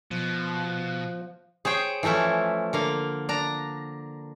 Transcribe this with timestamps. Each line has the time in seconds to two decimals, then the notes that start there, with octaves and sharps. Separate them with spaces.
0.11 B2 F3 F#6
1.65 G#4 C5 C#5 G5
2.03 E3 F3 A3 C#4 E4
2.73 D3 A#3 F5
3.29 D4 A#5